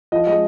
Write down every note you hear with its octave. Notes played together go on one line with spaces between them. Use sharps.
F3 D#5
G#3 D#5